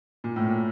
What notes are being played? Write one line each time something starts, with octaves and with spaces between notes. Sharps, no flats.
A#2
A2
A#2